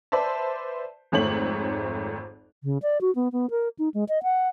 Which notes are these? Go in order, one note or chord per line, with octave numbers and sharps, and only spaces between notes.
B4 C5 D5 E5 A5
G#1 F2 G#2 A3 C#5 F#7
C#3
D5
F#4
B3
B3
A#4
D#4
G#3
D#5
F#5